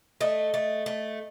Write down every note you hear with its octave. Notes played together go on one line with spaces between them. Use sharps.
A3 D#5
A3
A3